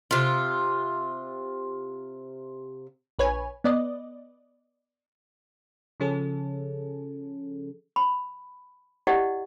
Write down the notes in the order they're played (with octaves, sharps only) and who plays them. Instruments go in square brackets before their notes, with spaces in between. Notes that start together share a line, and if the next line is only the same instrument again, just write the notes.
[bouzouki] C3 F4
[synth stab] A#1 B4 C#5 G#5
B3 D5 D#5
[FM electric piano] C#3 F3 C#4 G#4 A4
[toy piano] B5
E4 G4 D5 D#5 F#5